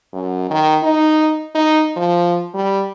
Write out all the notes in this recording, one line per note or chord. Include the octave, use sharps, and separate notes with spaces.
F#2
D#3
D#4
D#4
F3
G3